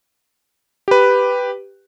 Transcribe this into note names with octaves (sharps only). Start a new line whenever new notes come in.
G4 B4